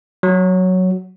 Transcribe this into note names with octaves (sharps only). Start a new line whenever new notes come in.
F#3